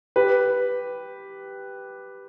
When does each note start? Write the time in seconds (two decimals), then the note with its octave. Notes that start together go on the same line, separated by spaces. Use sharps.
0.16 G4 B4